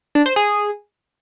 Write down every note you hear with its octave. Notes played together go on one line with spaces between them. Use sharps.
D4
C5
G#4